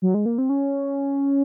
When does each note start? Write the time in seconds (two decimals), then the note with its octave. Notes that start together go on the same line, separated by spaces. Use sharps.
0.02 F#3
0.14 G#3
0.26 A#3
0.38 C4
0.49 C#4